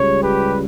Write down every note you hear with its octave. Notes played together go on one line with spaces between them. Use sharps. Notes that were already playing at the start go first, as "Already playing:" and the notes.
Already playing: C#2 C#3 G3 C#5
G4 B4